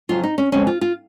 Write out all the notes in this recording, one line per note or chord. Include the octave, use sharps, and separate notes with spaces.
F2 C#3 F#3 F4
D#4
C#4
F2 C#3 G#3 B3 C#4
F4
F4